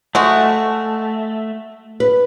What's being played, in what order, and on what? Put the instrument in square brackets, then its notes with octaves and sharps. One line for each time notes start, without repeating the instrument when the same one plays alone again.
[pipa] G#3 F#4 [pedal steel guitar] A3
[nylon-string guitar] B4